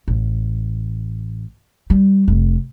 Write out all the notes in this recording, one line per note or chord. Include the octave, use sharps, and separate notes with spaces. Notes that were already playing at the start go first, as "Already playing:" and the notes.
A1
G3
F1